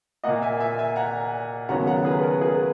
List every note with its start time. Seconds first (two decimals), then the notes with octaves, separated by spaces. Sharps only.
0.24 A#2 A#3 D#5 F#5
0.42 E5 G#5
0.60 E5 G#5
0.78 E5 G#5
0.96 F#5 A#5
1.69 D#2 C#3 F#3 B3 F#5 A#5
1.87 F#5 A#5
2.05 G#4 B4
2.23 A#4
2.41 G#4 B4